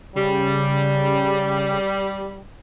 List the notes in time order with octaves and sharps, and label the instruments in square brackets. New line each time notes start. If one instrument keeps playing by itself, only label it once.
[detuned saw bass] C#3 [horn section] G3